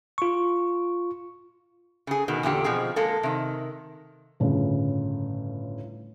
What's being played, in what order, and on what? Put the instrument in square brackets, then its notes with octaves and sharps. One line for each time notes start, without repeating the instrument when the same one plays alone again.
[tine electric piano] F4 C#6
[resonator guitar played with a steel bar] C#3 G#4
B2 D#3
E2 A#2 D3 G4
B2 F3 C4 G#4
G#3 A#3 A4
C3 D#3
[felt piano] G1 A2 C#3